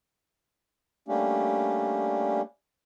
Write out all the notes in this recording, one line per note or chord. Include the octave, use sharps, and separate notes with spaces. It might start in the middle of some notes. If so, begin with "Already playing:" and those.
G3 A3 A#3 C#4 D4 G4